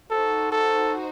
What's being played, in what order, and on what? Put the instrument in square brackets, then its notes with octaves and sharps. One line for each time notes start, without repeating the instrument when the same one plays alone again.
[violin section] D#4 F#4 C5 [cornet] A4
[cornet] A4